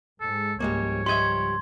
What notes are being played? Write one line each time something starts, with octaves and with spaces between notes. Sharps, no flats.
G#2 G#3 A4
C#2 G#2 F3 G3 G#3 A#3 C#5
G3 D#5 E5 C6 G#6